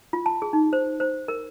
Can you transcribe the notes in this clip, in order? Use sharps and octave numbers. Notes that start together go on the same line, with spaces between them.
F4
A5
G#4
D#4
C5
C5
A#4